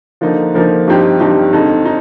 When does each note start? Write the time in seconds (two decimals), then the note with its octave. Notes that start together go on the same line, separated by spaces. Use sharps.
0.21 D3 F3 A#3 D#4
0.54 D3 F3 A#3 D#4
0.88 G2 F3 C4 D#4 G4
1.20 G2 F3 C4 D#4 G4
1.53 F2 D3 G#3 D#4
1.85 D#4